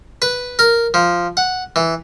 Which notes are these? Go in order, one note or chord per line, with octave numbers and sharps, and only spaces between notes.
B4
A#4
F3
F#5
E3